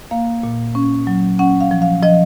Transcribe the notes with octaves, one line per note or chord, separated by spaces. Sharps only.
A#3 F5
A#2
C#4
F#3
C#4 F#5
F5
F3
F5
F3 D#5